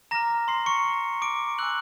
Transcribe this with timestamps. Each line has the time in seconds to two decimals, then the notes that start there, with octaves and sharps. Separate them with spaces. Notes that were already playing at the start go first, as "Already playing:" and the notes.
0.11 A#5 D6 F6 A#6
0.48 C6 C7
0.66 C#6 C#7
1.22 D6 D7
1.58 G#5 C6 E6 F#6 F#7